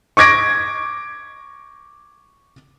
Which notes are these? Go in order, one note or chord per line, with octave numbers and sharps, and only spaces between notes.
C#6 D6 G#6 A#6 D7